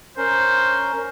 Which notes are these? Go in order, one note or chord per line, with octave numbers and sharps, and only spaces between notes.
C#4 A#4 C5